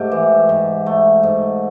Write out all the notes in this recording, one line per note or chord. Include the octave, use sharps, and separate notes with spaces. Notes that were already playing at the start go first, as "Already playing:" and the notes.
Already playing: G#2 A3 G4
E3
G#2
A3
G#2